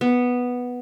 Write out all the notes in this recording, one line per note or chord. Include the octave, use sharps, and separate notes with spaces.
B3